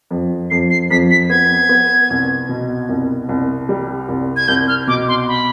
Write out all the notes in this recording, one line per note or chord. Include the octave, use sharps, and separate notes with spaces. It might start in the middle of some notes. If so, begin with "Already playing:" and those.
F2
F2 C7
C7
F2 B6
B6
B3 G#6
B3
C2
B2
C2
C2
G3
C2
G#6
C2 G6
F6
B2 D6
C6
B5